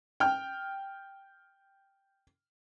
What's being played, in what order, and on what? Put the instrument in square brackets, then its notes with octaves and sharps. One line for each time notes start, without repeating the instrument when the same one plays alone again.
[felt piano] G5 F6